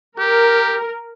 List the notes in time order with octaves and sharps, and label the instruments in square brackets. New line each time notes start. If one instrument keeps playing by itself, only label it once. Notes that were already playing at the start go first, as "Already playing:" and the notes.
[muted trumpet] G4 [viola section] A#4